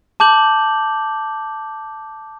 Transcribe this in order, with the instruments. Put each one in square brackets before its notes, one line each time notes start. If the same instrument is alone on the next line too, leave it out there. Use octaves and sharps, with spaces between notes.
[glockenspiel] A5 D6 G6 F#7